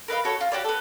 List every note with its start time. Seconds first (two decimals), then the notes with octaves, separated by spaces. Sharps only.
0.08 A#4 B4 D#5 F5
0.25 F#4 A4 C#5
0.41 F4
0.52 F#4 G4 C#5 D5
0.64 B3 A4